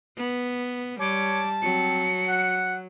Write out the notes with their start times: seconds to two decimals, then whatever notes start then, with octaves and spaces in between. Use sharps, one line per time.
0.17 B3
1.00 G3 C#5 A5 D6
1.62 F#3 C4 C#7
2.28 F#5